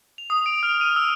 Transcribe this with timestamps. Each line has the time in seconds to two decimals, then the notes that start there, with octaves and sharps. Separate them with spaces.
0.18 F7
0.30 D#6
0.46 D7
0.63 F6
0.81 D#7
0.96 E6